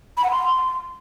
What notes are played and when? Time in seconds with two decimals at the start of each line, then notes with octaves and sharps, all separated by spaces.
0.17 B5
0.24 F#5
0.31 C6